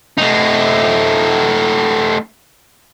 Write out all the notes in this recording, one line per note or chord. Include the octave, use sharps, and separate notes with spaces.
A3 D#4